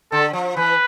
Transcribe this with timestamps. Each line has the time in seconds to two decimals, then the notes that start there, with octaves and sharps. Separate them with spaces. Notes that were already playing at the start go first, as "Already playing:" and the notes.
0.12 D3 A4
0.33 F3
0.57 E3 B4